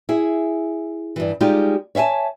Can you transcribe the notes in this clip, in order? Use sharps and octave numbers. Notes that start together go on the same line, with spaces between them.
E4 G#4
G2 E3
G3 G#3 D#4 F4 G4
C#5 E5 F5 G#5 A5